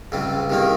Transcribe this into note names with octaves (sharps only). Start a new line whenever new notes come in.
C#2 C3 G3
C2 C3 D#3 A#3